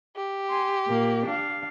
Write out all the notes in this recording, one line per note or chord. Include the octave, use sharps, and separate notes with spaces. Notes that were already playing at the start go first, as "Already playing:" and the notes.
G4
G#5 C6
A#2 A#3
D4 F5